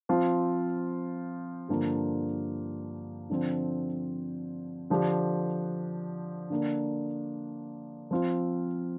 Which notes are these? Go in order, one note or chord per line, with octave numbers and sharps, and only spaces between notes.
F3 C4 F4
G2 D3 F3 A#3
D3 F3 C4
D3 F3 D4 G4
D3 A#3 D4
F3 C4 F4